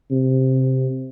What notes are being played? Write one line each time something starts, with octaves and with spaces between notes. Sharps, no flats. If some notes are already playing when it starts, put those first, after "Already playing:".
C3